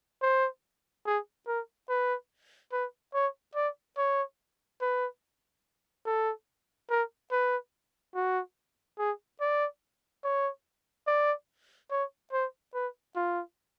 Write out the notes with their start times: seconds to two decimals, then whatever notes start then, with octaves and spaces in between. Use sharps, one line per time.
0.22 C5
1.06 G#4
1.47 A#4
1.89 B4
2.73 B4
3.14 C#5
3.56 D5
3.98 C#5
4.81 B4
6.06 A4
6.90 A#4
7.32 B4
8.15 F#4
8.99 G#4
9.41 D5
10.24 C#5
11.07 D5
11.91 C#5
12.33 C5
12.74 B4
13.16 F4